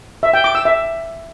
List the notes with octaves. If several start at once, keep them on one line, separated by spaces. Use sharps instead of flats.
E5
G5
D6
E6
E5